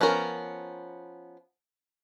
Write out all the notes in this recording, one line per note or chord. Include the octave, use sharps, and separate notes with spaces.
F3 B3 C#4 A#4